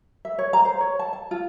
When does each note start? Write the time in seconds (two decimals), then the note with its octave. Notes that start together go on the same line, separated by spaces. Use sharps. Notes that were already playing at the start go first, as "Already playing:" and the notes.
0.25 E5
0.38 C#5
0.53 A#5
0.65 C5
0.81 C#5
0.99 A5
1.13 A5
1.31 F4